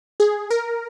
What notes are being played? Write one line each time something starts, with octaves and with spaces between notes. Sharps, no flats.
G#4
A#4